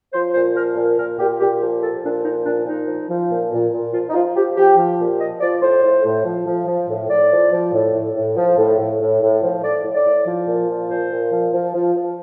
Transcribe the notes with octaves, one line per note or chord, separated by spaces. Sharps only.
F3 C5
A#2 C5
F3 A#4
A#2
A#2 A#4
A#2 G4
A#2 G4
F3 G4
F3 A4
A#2 D4
F3 D#4
A#2 D4
A#2 D#4
F3
F3
A#2
A#2
A#2
F3 F4
D#4
F3 F4
F3 G4
F3 G4
F3
A#2
F3 D#5
F3 D5
A2 C5
A2
A2
F3
F3
F3
A2
A2 D5
F3
F3
A2
A2
A2
F3
A2
A2
A2
A2
F3
A2 D5
A2
D5
A2
F3
A#2
F3
A#2 C5
A#2
F3
F3
F3
F3